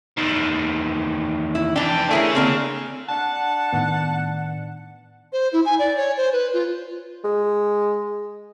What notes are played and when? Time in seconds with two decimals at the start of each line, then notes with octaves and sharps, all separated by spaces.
0.18 E2 D#3
1.55 E4
1.76 F2 E3 D4 G4
2.11 A3 E4 G#4 A#4 C#5
2.35 D3 A#3 C4
3.09 D4 F#5 A5
3.73 A2 D#3 B3
5.33 C5
5.53 E4
5.65 G#5
5.79 D5
5.97 C#5
6.17 C5
6.33 B4
6.54 F4
7.24 G#3